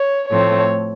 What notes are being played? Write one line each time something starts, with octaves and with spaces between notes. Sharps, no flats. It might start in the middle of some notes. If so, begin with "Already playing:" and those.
Already playing: C#5
A2 F3 A3 C4 C#5